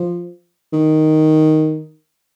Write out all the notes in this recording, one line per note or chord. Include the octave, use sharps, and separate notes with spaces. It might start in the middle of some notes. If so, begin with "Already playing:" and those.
Already playing: F3
D#3